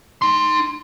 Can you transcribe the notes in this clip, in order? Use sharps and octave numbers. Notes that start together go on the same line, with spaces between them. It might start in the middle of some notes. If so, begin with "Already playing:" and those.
D#4 C6